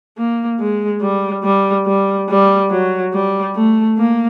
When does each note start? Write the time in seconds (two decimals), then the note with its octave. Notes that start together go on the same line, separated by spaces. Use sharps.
0.17 A#3
0.59 G#3
1.02 G3
1.44 G3
1.87 G3
2.29 G3
2.71 F#3
3.13 G3
3.55 A3
3.98 A#3